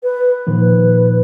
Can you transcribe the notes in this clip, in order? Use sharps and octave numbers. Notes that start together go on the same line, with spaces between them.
B4
A#2 D#3 F3 B4